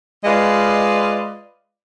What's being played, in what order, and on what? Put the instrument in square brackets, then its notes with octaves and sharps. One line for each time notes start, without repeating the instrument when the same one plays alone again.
[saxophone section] G#3 F4 B4 D5 D#5 F5